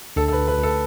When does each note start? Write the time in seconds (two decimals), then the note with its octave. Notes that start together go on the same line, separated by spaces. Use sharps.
0.16 D2 A4
0.28 A4
0.33 B4
0.38 D2
0.48 B4
0.58 D2
0.63 A4